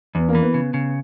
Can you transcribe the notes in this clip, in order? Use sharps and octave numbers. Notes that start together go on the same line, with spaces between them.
E2 B3
A#3
E3
B3
C#3
C#3